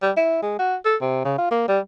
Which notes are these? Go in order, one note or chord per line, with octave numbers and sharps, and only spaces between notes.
G3
E4
G#3
F#4
A4
C3
C#3
F4
A#3
G3